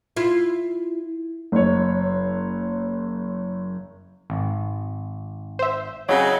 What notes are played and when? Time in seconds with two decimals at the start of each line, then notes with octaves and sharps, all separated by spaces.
0.16 E4 F4
1.52 F#1 C#5
4.30 G#1
5.59 C5 E5
6.09 C#3 F#3 C4 E4 C#5 D#5 E5